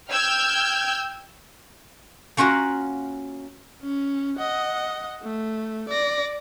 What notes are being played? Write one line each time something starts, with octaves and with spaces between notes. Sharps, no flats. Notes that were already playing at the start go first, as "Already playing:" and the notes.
G5 E6 F6 G6 G#6
A#3 C#4 F4 F#4 A#4
C#4
D#5 F#5
A3
D5 A#6